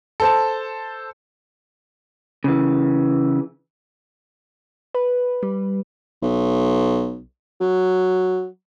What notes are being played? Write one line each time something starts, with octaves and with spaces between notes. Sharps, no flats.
A4 C5 A5
C#3 E3
B4
G3
B1
F#3